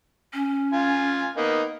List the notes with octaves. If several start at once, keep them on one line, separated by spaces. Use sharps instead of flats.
C#4
F4 G#5
A#3 B3 D#4